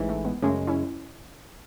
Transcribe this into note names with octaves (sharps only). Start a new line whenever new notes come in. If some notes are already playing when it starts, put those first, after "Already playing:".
Already playing: A1 G#2 E3
A3
G#3 B3
F#2 C#3 G#3 A3 C#4
C#4 E4